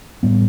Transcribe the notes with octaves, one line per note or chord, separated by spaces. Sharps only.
A2 G3 B3